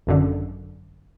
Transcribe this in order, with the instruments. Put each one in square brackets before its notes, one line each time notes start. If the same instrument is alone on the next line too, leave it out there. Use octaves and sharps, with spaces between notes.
[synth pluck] G#1 F#2 D3